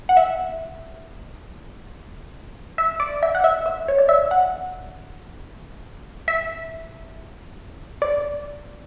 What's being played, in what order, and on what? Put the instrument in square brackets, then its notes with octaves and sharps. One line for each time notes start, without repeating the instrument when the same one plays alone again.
[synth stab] F#5
E5
E5
D5
E5
F#5
E5
E5
C#5
D5
E5
F#5
E5
D5